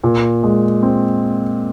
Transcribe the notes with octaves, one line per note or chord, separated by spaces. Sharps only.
A#2
G#3
C4